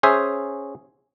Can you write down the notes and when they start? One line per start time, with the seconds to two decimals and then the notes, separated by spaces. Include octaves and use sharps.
0.03 C#4 G#4 C5 E5